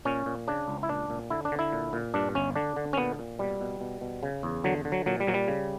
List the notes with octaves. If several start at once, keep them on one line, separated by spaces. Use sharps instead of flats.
A#2 C#4
A#2
C#3 D4
C#2
E4
A#2 D4
A#2
D3 E4
D4
D3
E4
A#2
A#2
G2 D4
G1 C#4
D3 D4
D3
C#4
A#2 B3
A#2
B2 G3
B2
B2
B2
C#3
E2
D3 F#3
D3
F#3
A#2 F#3
G3
A#2 F#3
G3
C#3